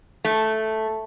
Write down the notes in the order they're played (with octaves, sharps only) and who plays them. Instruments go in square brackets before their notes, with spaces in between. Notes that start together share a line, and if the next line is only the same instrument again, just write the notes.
[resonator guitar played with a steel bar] A3